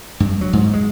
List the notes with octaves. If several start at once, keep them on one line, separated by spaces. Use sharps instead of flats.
G2
F#3
G#2
G#3